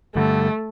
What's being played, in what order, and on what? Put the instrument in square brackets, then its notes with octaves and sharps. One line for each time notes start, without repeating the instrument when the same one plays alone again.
[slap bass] G2 D3 G3 [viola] A3